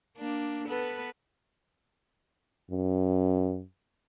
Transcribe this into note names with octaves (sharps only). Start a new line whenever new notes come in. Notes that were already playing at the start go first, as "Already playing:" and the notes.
A#3 D4
B3 A4 B4
F#2